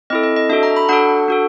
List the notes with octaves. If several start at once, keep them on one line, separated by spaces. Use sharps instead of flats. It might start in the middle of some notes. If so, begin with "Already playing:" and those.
C4 E4 A4 D#5
D#5
D#5
D4 F#4 A4 E5
A#5
B5
D4 F#4 A4 F#5
D4 F#4 A4